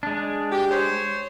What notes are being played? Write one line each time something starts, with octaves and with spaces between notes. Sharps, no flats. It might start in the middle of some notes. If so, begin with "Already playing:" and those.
G#3 D4
G4
C5 C#5